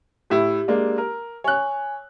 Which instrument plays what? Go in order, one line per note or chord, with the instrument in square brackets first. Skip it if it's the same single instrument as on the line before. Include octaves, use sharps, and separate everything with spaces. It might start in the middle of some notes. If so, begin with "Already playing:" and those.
[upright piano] A2 E4 [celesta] G4
[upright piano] G#3 A#3 D4
A#4
[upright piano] C#5 F#6 [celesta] G#5